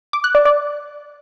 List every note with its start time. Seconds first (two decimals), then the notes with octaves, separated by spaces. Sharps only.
0.13 D6
0.24 F#6
0.35 D5
0.45 D5